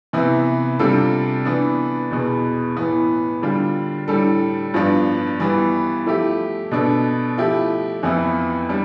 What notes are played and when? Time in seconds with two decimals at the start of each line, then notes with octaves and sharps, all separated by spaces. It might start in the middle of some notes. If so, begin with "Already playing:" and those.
0.13 C3 E3 B3 E4
0.79 C3 G3 D4 F4 A4
1.45 E3 B3 D4
2.11 E2 B2 B3
2.77 A2 E3 B3
3.42 D3 G3 D4 F4
4.08 A2 G3 D4 A4
4.74 G2 F3 B3 D4
5.40 E3 G3 B3
6.06 F3 A3 E4 G4
6.71 B2 B3 D4 A4
7.38 F3 A3 E4 G4
8.03 F2 E3 B3 E4
8.69 G3 D4